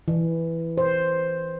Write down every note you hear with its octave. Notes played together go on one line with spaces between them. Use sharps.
E3
C5